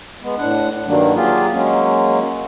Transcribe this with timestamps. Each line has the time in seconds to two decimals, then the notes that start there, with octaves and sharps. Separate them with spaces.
0.22 G#3 B3
0.38 A2 D4 F#5
0.87 G2 D#3 F#3 G3 A#3 D4
1.15 F#3 A#3 F4 G4 G#4
1.52 F#3 G#3 A#3 C#4